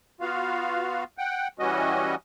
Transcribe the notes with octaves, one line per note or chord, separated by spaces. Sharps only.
B3 F4 F#4 F5
F#5 G5
E3 G3 C#4 F#4 D#5